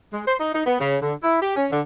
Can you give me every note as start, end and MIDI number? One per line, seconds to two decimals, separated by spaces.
0.13 0.22 56
0.28 0.35 72
0.40 0.54 63
0.55 0.66 63
0.66 0.79 59
0.80 0.98 49
1.02 1.15 50
1.23 1.39 64
1.42 1.56 67
1.56 1.67 61
1.72 1.82 50